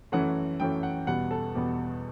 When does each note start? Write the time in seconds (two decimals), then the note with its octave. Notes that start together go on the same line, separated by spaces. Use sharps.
0.12 F#2 E3 A3 C#4 F#5
0.60 F#2 E3 A3 C#4 G5
0.83 F#5
1.07 E2 B2 G3 B3 F#5
1.31 A4
1.55 E2 B2 G3 B3 G4